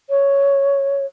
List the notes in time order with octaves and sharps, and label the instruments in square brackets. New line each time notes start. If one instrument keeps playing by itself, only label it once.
[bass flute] C#5